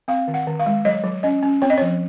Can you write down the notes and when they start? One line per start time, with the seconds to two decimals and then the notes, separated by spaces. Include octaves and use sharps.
0.08 C4 F5
0.28 D#3
0.34 F#5
0.47 D#3
0.59 F5
0.66 G#3
0.85 F#3 D#5
1.04 F#3
1.23 C#4 D#5
1.42 C#4
1.62 C4 C#5
1.70 D#5
1.78 F3 C#5